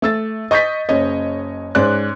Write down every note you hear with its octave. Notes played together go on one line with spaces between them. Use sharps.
A3 E6 A6
D#5 C#6 G6 A6 B6
F#1 C#3 C#5 D#5
G#2 C#4 D5 F#6